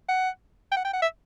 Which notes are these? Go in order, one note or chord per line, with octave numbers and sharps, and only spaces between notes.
F#5
G5
F#5
G5
F#5
E5